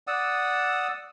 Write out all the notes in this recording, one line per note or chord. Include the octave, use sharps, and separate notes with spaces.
D5 F#5 D#6 E6